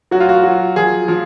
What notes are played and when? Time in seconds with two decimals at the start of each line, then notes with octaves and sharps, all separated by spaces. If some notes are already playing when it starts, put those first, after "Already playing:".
0.11 F#3 F#4
0.20 F4
0.29 F#4
0.43 F#3
0.76 F3 G#4
1.08 F3